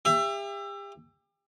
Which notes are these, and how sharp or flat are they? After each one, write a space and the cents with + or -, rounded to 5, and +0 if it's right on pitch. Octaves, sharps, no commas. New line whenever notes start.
G4 +35 E5 +25